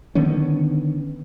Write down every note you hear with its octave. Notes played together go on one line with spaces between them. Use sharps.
D3 D#3 B3 C#4